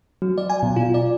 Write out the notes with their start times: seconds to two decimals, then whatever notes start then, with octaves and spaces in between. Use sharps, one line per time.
0.22 F#3
0.38 D5
0.50 G#5
0.63 B2
0.76 F4
0.94 D5